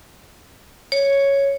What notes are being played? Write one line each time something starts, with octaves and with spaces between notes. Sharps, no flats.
C#5